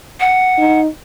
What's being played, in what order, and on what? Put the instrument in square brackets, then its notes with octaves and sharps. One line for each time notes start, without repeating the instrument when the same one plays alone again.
[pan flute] F#5
[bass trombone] D#4